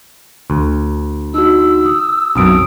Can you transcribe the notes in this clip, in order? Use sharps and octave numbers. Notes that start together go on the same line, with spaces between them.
D2
D#4 F#4 E6
D#6
B1 F#2 C4 D#6 D7